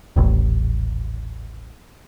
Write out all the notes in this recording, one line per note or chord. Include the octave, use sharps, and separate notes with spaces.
D#1 A1